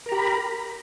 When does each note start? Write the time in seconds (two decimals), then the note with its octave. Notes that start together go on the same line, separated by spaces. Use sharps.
0.06 A#4
0.09 A#5
0.12 G4
0.15 B5